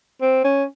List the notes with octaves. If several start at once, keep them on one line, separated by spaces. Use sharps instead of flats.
C4
C#4